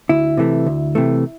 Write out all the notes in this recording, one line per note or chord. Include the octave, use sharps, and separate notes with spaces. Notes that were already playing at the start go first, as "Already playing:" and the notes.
D2 E4
C3 E3 A3
D2
C3 E3 A3